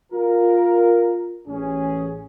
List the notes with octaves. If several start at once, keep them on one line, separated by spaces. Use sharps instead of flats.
F4 A#4
A1 C#4 G#4